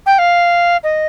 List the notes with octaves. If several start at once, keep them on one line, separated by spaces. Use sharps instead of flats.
G5
F5
D#5